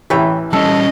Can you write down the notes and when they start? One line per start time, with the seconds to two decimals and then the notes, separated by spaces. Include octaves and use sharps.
0.10 A1 E3 B4 C#5 G5
0.53 G3 C#4 A4 D#5